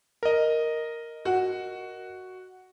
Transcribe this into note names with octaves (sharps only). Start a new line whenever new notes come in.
A#4 D#5
F#4